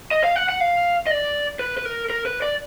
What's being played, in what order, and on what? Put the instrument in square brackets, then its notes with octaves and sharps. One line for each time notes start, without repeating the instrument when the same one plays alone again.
[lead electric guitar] D#5
F5
F#5
F#5
F5
D#5
D5
B4
B4
A#4
A#4
B4
D5